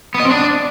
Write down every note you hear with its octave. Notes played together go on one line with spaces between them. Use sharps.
B3
D#5
C4
D4